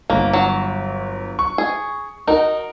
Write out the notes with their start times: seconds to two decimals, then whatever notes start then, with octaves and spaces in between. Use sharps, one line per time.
0.10 G1 A#3
0.33 F#3
1.39 C#6
1.58 G#4
2.27 D#4 F#4 A#4